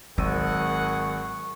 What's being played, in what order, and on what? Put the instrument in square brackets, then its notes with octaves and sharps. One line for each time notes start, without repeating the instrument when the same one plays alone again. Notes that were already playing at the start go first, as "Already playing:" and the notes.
[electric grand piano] G#1 E6 D#7 [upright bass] F#3 [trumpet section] G#4 A#4 F#5 [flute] C#6